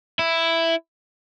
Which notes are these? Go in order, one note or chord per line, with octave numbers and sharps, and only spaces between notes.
E4